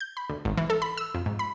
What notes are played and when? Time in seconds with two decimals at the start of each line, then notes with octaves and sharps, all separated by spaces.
0.01 G6
0.17 B5
0.30 D2
0.45 G#1
0.57 E3
0.70 A4
0.82 B5
0.97 E6
1.15 F2
1.26 G#2
1.39 B5